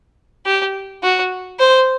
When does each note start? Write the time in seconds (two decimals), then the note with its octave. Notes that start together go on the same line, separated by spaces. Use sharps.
0.46 G4
1.03 F#4
1.59 C5